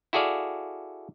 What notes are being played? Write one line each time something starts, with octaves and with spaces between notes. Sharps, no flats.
E4 F#4 G#4 A4 D5 F5